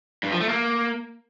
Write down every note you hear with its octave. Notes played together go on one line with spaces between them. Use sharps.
G2
F3
A3
A#3